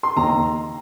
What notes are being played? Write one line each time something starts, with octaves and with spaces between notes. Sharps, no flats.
C6
D#2 A#5